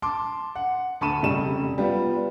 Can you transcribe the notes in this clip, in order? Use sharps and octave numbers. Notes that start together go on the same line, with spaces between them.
A5 C6 D6
F#5
D2 A5 B5 C#6 D#7 E7
F1 C#3 G3 E7
G3 B3 F4